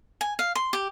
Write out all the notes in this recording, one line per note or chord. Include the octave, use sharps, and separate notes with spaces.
G#5
F5
C6
G4